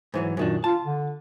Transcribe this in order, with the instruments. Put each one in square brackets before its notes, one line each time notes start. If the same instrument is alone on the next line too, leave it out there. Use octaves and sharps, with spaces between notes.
[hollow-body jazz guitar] G#2 E3 F#3
[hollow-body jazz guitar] F#2 D#3 D4 [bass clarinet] A#2
[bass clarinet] F4 [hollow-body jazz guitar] A5
[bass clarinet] D3